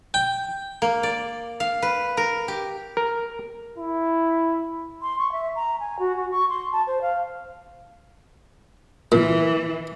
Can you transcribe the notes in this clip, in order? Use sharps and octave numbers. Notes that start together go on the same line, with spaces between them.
G5
A#3
D5
F5
B4
A#4
G4
A#4
E4
C6
C#6
E5
A#5
G#5
F#4
F#4
C#6
C6
A5
C5
F5
A#2 E3